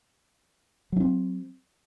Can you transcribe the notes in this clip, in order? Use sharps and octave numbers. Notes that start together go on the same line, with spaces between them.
F#3 C4 D4